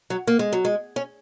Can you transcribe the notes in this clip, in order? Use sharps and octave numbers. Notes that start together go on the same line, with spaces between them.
F#3
A#3
G#3
F#3
G#3
C#4